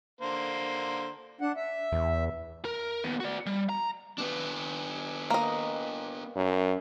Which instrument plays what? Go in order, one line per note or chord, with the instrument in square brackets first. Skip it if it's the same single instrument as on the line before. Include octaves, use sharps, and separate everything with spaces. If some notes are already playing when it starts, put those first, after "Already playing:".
[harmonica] D3 A#3 C5
[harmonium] D4 F#5
E5
[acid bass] E2
[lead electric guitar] A#4
D#2 B3
F#4 D5
G3
A#5
B3 D4
[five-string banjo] A#3 D#5
[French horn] F#2